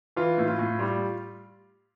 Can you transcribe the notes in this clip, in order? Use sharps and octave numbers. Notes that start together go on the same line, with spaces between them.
E3 F4
A2
F4
A2
G3 F4